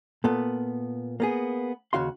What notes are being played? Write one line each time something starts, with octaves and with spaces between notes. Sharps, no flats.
A#2 B3 A4
A#3 B3 G#4
D#2 C#3 F#4 F5 C6